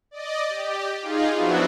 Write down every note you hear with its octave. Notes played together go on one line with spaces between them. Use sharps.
D5 D#5
G4
D#4 F4 G#4
F3 F#3 B3 D4 E4 F#4